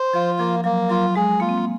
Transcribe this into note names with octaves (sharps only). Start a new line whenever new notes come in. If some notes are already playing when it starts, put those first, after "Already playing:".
Already playing: C5
F3 F4
F3 A#3
F#3 A#3
F#3 F4
G#3 G#4
A#3 F4
C4
A#3